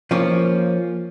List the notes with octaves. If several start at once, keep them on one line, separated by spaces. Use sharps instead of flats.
F3 A#3 C#4